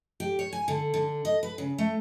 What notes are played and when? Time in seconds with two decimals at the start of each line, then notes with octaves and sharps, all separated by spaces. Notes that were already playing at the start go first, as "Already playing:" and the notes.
0.20 G4
0.39 C#5
0.53 G#5
0.68 D3
0.94 D3
1.25 D#5
1.43 B4
1.58 C#3
1.78 A3